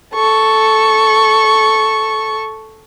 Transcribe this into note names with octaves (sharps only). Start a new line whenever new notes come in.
A4 C#6